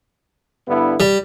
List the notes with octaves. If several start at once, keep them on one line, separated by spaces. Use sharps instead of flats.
G2 D3 B3 E4
G3